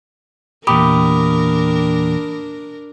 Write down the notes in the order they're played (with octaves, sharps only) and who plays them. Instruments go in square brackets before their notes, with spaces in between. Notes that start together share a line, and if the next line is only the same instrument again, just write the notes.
[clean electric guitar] E2 A#2 G4 [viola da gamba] D4 A#4 [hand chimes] B5 D6 D#6